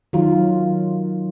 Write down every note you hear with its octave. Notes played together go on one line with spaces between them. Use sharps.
D#3 F#3 F4